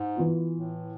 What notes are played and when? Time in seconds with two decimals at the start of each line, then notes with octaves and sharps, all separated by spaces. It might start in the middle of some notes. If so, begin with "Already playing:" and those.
Already playing: G#2
0.16 E3 B3 F4
0.52 A2